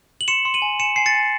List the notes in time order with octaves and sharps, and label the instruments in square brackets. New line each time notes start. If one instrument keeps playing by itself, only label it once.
[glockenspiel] F#7
C6 C#7 E7
C6
D#7 F#7
G#5
G#5 C#7 E7
G#5 C7
A6 C#7
G#5